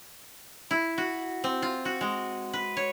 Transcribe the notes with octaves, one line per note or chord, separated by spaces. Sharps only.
E4
F#4
C4
F4
F#4
G#3
B4
C#5